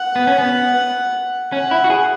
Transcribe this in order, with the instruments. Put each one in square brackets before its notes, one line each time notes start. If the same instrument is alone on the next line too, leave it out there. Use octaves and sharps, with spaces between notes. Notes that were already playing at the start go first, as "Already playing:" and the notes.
Already playing: [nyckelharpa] F#5
[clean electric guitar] B3
C#4
B3
[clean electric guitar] C#4 [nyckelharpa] F#5
[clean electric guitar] E4
F#4
G#4